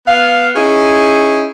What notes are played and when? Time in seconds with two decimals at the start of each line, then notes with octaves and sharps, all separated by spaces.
0.07 B3 F5
0.55 C#4 D#4 E4 G#4